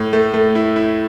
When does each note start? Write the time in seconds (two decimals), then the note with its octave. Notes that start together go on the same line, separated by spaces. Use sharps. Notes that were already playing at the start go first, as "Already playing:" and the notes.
Already playing: A2
0.13 A3
0.34 A3
0.55 E4
0.76 E4